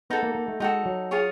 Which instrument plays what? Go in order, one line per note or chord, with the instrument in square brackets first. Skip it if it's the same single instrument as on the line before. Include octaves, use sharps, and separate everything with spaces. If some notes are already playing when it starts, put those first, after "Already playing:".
[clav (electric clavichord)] B3 [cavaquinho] D#4 F#4 A4
[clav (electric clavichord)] A#3
A#3
A3
[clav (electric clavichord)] G#3 [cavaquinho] D#4 F#4 A4
[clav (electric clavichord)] F#3
[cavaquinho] F4 G#4 C#5